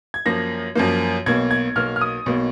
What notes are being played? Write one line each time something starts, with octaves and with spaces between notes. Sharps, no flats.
G#6
F#2 F3 A#3 A#6
F#2 F3 A#3
B1 B2 A#3 G#6
G#6
B1 B2 A#3 F6
F6
D#6
B1 B2 A#3